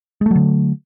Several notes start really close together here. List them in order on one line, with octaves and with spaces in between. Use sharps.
G#3 A3 F#3 D3